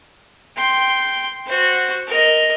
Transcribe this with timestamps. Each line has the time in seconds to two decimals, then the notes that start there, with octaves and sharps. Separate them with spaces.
0.56 G5 C6
1.46 F#4 C5
2.07 A#4 D#5